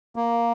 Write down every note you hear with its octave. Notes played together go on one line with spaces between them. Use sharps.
A#3